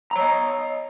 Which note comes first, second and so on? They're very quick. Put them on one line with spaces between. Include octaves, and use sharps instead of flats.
A#5 C#5 D#5